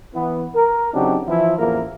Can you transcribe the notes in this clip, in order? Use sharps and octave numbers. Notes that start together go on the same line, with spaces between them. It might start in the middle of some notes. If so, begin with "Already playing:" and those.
E3 B3
A#4
C#3 F#3 C4 D4 D#4 G4
E3 F3 E4
A1 E2 F3 A#3 E4 A#4